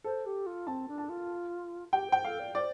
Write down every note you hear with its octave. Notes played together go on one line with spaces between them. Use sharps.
A4 C5
G4
F4
C4 A5
D4
A5
F4
G4 G5
C5 G5
A4 F5
D5
C5 D5